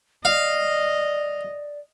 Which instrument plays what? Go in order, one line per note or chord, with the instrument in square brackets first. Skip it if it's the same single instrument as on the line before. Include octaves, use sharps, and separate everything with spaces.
[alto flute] D5 [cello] D#5 [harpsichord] F5